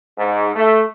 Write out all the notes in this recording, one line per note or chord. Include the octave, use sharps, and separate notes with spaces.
G#2
A3